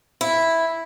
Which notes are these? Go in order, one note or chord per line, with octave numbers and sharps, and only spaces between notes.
E4